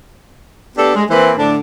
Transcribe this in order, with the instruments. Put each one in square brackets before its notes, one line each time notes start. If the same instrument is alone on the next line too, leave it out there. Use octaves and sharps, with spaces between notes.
[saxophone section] B3 D4 G4 A4
G#3
E3 A#3 C4 B4 C5
A2 D3 D4